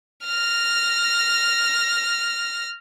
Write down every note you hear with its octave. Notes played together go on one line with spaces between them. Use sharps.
F6 A#6